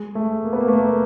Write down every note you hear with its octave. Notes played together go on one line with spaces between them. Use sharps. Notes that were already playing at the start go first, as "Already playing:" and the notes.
Already playing: G#3
A3
A#3
B3
A#3
A3
A#3